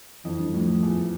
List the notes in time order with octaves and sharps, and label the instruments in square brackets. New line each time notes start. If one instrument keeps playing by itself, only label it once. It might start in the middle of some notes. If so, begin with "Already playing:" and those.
[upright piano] F2 [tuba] E3
[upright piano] G2
[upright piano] A2 [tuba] F3
[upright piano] A2
E2